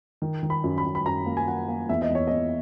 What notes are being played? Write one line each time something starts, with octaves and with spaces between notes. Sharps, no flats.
D#3
D#3
B5
F#2
B5
F#2
B5
F#2 A#5
A#3
G#5
F#2 F#5
A#3
E2 E5
D#5
E2 C#5
E2 D#5